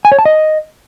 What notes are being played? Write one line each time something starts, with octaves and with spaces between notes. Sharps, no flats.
G#5
C#5
A5
D#5